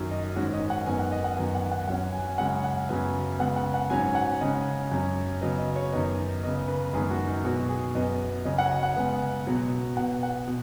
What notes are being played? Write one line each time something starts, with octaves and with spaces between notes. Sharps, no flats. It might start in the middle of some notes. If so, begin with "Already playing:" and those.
Already playing: F#2 D#3 F#3
D#5
G#2 D#3 G#3 C#4 F#4
D#5
F#5
F#2 D#3 B3 G#5
F#5
D#5
F#5
F#2 D#3 B3 G#5
F#5
F#5
F#2 F#3 C#4 F#5
G#5
F#2 C#3 G#3 C#4 F#5
F#5
F#2 C#3 F#3 B3 G#5
C#3 G#3 B3 F#5
F#5
F#5
G#2 F#3 C#4 G#5
F#5
C#3 G#3 C#4 D#5
F#2 F#3 C#4
C#3 F#3 B3 D#5
D#5
C#5
F#2 D#3 B3 D#5
C#3 B3 D#5
B4
F#2 D#3 G#3 B3 G#4
F#4
D#4
B2 F#3 B3 F#4
G#4
F#2 F#3 B3 D#5
C#3 F#3 C#4 D#5
F#5
D#5
F#5
C#3 G#3 B3
B2 F#3 B3
B2 B3 F#5
F#5
B2